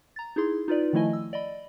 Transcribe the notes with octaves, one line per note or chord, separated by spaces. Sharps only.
A#5 A6
D#4 E4 G#4 C6
D#4 F4 B4 D5
D#3 F3 A3 E4 D#5 G#5
E6
D5 D#5 B5